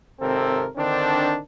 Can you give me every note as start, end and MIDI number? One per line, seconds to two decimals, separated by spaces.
0.20 0.67 32
0.20 0.67 48
0.20 0.67 60
0.20 0.67 69
0.20 0.67 70
0.77 1.38 50
0.77 1.38 51
0.77 1.38 60
0.77 1.38 62